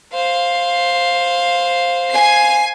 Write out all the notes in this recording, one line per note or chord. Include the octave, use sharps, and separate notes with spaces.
C5 F5
G#5 C7